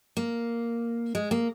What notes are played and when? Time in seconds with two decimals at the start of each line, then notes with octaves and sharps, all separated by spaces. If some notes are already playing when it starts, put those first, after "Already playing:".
0.17 A#3
1.15 G#3
1.31 A#3